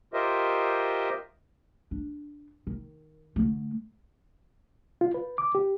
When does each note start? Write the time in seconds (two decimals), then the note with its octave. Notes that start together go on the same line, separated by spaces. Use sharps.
0.14 F4 G4 A#4 C5 D#5 E5
1.91 D4
2.67 D#3
3.36 D3 A3
5.01 F4
5.14 B4
5.38 D6
5.55 G4